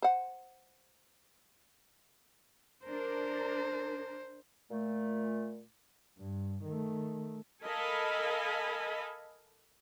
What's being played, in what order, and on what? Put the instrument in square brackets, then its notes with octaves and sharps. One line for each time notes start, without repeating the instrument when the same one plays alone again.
[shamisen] C5 F#5
[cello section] D4 A#4 [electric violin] C5
[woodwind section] A#2 A3
[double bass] G2
D#3 A3
[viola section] A4 A#4 D#5 F5 G#5 B5